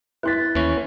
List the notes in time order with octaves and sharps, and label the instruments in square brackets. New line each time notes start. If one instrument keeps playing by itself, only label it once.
[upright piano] E4 F#6 B6 [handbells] B4 C6 A6
[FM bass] D#2 [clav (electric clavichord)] E3 C#4